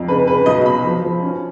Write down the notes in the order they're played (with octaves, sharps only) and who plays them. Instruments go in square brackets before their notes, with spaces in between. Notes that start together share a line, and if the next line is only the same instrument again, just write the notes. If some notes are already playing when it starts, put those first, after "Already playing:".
Already playing: [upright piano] F2
C#3 B4
C#3 B4
B1 D#5
B2 B5
F3
F3
C#4